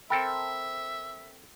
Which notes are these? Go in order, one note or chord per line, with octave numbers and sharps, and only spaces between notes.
C4 A4 A#4 E5 G5 B5